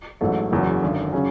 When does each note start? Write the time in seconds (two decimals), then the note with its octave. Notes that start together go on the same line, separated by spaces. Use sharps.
0.21 A1 G#2 F#3 A3
0.51 F#1 E2 C#3 F#3
0.82 G#1 F#2 D3
1.13 C#3 F#3 C#4